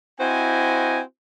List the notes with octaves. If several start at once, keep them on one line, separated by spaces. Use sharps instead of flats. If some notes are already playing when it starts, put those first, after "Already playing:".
C4 E4 F#4 C5 D#5 G#5